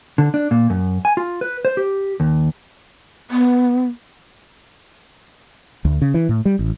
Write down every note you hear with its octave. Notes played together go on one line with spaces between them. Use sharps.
D3
D4
A#2
F#2
G#5
F4
B4
C5
G4
D#2
B3
D2
C#3
E3
A2
G3
A1